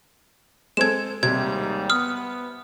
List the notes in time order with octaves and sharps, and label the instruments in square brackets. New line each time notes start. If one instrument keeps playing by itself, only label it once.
[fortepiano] G#3 C4 A4 [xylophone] G#6 E7
[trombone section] D#2 G#2 G3 [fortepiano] C3 [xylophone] G#6
[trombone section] B3 [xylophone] D#6 F6